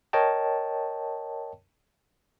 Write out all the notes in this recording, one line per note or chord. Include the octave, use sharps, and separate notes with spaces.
A#4 C#5 D#5 G5 A5